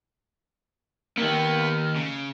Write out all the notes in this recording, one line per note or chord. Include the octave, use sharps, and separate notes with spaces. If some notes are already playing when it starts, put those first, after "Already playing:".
D#3 A#3 B3
C#3